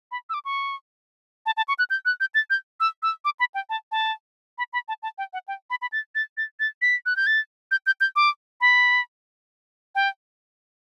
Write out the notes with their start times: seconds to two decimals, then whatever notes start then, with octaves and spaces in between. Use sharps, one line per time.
0.11 B5
0.30 E6
0.34 D6
0.45 C#6
1.46 A5
1.57 A5
1.68 C#6
1.79 F#6
1.90 G6
2.05 F#6
2.20 G6
2.35 A6
2.50 G6
2.80 E6
3.03 E6
3.25 D6
3.40 B5
3.54 G5
3.70 A5
3.92 A5
4.58 B5
4.73 B5
4.88 A5
5.03 A5
5.18 G5
5.33 F#5
5.48 G5
5.70 B5
5.82 B5
5.92 A6
6.15 A6
6.37 A6
6.60 A6
6.82 B6
7.06 F#6
7.16 G6
7.27 A6
7.71 G6
7.86 G6
8.01 G6
8.16 D6
8.61 B5
9.95 G5